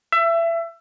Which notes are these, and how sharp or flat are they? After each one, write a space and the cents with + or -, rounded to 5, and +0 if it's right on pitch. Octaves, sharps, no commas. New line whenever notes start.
E5 +25